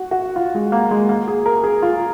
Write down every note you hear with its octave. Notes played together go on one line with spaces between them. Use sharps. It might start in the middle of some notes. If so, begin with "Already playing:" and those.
Already playing: F#4
F#4
F4
G#3
A#3
G#3
A#3
G#4
A#4
G#4
F4